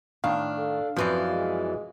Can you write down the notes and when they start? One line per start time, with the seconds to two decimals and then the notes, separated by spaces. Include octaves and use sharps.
0.24 A2 D#3 D4 F5
0.58 A4
0.97 F#2 E3 F3 C4 B4 D5
1.30 G#3